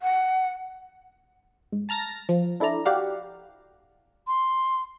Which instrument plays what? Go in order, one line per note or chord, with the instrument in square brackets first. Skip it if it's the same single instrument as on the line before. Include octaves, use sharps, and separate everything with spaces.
[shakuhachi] F#5
[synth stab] G#2
A5 A#5 F6 A6 A#6
F3
D4 E4 A4 D5 A#5
F#4 G4 D5 F5 F#5
[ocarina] C6